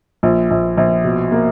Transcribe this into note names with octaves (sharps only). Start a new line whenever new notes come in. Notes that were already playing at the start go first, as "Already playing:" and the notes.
A#1
A#1
A#1
B2
A#3